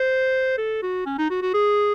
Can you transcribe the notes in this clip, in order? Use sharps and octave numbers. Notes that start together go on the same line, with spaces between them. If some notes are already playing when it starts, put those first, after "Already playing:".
Already playing: C5
A4
F#4
C#4
D#4
F#4
F#4
G#4